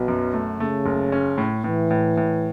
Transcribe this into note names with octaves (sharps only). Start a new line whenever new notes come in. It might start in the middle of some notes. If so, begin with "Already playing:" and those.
Already playing: B1 B2
F#2
A3
C#3 A3
F#1
C#4
A2
A2 E3
A2
A2